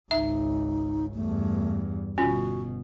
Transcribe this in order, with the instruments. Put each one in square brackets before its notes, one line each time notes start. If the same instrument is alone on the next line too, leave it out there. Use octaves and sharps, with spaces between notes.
[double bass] G#1 C#2 [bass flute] D#4 [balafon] E5
[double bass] E2 G2 [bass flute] A3
[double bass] G1 B2 [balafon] C#4 F4 [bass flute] F#4